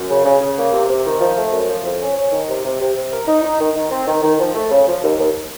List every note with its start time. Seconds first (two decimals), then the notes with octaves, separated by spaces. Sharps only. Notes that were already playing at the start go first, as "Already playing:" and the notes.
Already playing: F#2
0.09 C#3
0.25 C#3
0.41 C#3
0.57 A#3
0.73 C3
0.89 C3
1.05 D#3
1.20 F3
1.36 A3
1.52 F#2
1.68 F3
1.84 F2
2.00 C#4
2.16 C#4
2.32 D#3
2.48 C3
2.64 C3
2.80 C3
2.96 C3
3.11 A#4
3.27 D#4
3.43 D#4
3.59 D#3
3.75 D#3
3.91 C4
4.07 D#3
4.23 D#3
4.39 F3
4.54 A3
4.71 C#3
4.87 F3
5.03 D#2
5.19 D#2